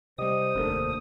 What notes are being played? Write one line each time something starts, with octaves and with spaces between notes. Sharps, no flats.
C3 G3 G4 C5 D#5 D#6
F1 A#1 D#2 A3 A#3 D4